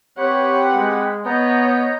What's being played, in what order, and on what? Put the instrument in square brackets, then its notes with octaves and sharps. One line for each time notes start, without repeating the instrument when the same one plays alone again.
[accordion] C4 G4 B4 [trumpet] C#5 [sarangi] F#5
[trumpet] G#3
[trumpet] B3 [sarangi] C#5 [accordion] D#5 A#5 G6